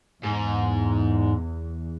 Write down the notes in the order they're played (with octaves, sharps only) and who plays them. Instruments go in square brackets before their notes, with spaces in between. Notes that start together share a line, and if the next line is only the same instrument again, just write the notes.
[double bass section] E2 [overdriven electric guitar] G#2